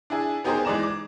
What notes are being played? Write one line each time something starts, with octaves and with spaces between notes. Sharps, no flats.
D4 E4 G#4
B3 D#4 G4 G#4 A#4 C5
E3 G#3 D#4 D5 A#5 E7
D6